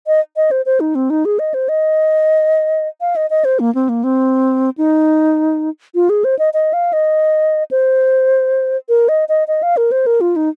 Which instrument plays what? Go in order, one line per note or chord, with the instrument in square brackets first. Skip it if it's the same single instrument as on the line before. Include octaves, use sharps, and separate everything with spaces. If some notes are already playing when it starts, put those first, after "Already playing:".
[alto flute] D#5
D#5
C5
C5
D#4
C4
D#4
G#4
D#5
C5
D#5
F5
D#5
D#5
C5
A#3
C4
A#3
C4
D#4
F4
G#4
C5
D#5
D#5
F5
D#5
C5
A#4
D#5
D#5
D#5
F5
A#4
C5
A#4
F4
D#4